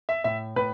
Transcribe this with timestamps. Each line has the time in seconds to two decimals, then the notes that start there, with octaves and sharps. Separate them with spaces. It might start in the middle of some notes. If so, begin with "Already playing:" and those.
0.09 E5
0.24 A2 E5
0.56 A2 B4